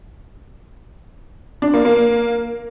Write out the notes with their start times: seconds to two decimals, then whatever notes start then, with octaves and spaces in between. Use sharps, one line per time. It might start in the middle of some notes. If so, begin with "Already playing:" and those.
1.62 D4
1.73 A#3
1.85 A#3